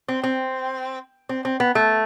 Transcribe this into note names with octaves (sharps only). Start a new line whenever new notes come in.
C4
C4
C4
C4
B3
A3